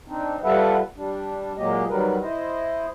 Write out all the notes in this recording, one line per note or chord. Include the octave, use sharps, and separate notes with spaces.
C4 D4 D#4
G3 F4 A4 B4 E5 F#5
G3 D4
A#2 F#3 G#3 A#3 G4 D#5
D#3 F#3 G3 A#4 B4
E4 C5 D#5